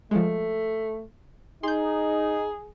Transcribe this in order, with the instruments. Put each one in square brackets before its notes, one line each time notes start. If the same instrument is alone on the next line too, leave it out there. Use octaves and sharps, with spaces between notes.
[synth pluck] F3 G#3 [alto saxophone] A3
[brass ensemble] D#4 [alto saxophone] G#4 [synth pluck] C6 G6